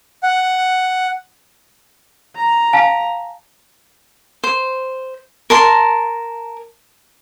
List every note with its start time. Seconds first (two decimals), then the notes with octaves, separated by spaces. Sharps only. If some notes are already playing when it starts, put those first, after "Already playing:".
0.23 F#5
2.36 A#5
2.73 F5 G#5 A5
4.44 C5
5.50 A#4 A5 C6